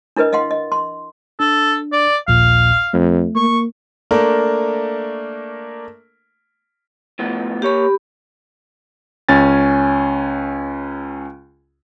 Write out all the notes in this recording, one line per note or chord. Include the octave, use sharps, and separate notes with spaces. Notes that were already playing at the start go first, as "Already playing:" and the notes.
D4 E4 A#4 B4 D#5
D#5 F5 F#5 C6
D#5
C6
D4 A4
D5
A#1 D#2 A#2 F5
F2 A3
A#3 C#6
A3 A#3 D4 A#4
A2 F3 B3
A#3 G4 C#5 B5
C#2 C#4 G#5 A6